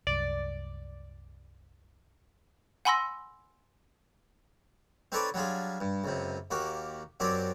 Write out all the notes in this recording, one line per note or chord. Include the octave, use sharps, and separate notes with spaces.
C2 F#2 D5
F#5 G#5 B5 C6 E6 A#6
C4 D#4 A4 B4 C#5 D5
F#3 G3 D4 F4 G#4
G2
C#2 F#2 C3
D#2 A#3 F#4 G4
F#2 F#3 C4 G4 D5